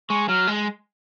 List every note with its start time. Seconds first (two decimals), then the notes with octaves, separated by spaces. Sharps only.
0.09 G#3 C#6
0.29 F#3 F6
0.47 G#3